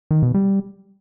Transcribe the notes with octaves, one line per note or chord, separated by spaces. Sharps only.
D#3
B2
G3